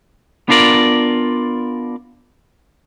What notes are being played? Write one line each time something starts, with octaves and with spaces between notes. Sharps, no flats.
B3 D4 F4 A#4 D5